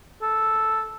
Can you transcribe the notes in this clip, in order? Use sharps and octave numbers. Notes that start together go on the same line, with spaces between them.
A4